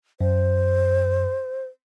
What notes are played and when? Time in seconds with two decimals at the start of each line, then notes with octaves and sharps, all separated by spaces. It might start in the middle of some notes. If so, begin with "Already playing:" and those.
0.21 F#2 C5